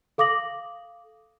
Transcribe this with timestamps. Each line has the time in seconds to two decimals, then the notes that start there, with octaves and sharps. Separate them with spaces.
0.18 A4 F5 D6 D#6 A#6 F#7